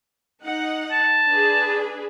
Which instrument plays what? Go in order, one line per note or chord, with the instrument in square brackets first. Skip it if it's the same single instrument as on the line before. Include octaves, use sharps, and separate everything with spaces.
[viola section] D#4 F#5
[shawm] A5
[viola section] D4 G#4 B4